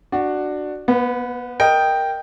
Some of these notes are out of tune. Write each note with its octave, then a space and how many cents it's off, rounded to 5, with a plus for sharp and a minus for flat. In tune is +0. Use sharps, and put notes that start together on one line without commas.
D4 +15 F#4 +0
B3 -30 B4 +20
A#4 +0 D#5 +0 G5 +0